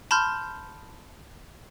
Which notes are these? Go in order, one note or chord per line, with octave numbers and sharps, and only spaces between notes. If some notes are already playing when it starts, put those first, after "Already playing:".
A5 B5 C6 F6 G6